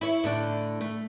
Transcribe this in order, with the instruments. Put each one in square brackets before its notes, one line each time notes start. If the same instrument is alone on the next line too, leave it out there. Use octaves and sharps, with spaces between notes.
[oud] E4 C#5
A2 D3 D4
A3